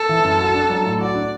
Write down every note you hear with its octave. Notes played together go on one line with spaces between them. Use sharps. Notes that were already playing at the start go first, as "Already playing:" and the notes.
Already playing: A4
E3
F#2
F#4
D4
F#3
A2
F#4 D5
D4